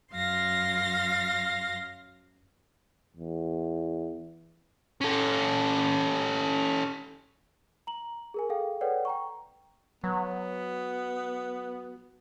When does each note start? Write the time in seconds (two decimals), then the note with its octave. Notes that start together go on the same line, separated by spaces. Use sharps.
0.13 F#2 F#3 F5 C6 A#6
3.17 E2
5.01 C#4 A4
7.87 A#5 F#7
8.34 G#4 A#4 G#5
8.49 G#4 A4 F5 G5
8.81 A4 B4 C#5 D5 F#5 G5
9.05 G5 A#5 C#6
10.04 F#3 B3